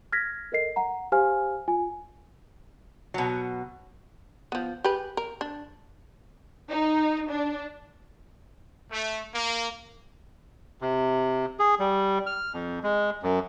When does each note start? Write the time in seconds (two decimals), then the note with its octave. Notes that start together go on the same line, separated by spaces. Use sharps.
0.12 F6 G#6 A#6 B6
0.52 A4 A#4 D#5 C7
0.76 F#5 A#5
1.12 G4 C5 F5 G#5 F6
1.68 F4 G#5
3.14 B2 F#3
4.52 F3 B3
4.84 G4 G#4 B4
5.17 A#4
5.41 D4
6.70 D#4
7.30 D4
8.91 A3
9.34 A#3
10.81 C3
11.59 G#4
11.79 G3
12.26 F6
12.53 F2
12.83 G#3
13.23 F#2